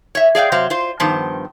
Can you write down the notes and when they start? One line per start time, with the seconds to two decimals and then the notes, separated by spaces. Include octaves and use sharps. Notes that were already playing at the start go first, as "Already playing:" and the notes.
0.15 C#5 E5
0.35 G#4 D5 F5 G5
0.52 C3 F#3 C5 F5
0.70 F4 C5
1.00 G2 D#3 F3 B3 C5 A5